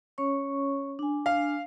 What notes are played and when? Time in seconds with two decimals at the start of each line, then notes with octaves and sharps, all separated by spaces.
0.18 C#4 C#5 C#6
0.99 D4 G#5
1.26 F5